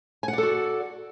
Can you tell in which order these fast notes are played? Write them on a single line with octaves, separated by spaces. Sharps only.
G#5 F#5 D5 A4 F#4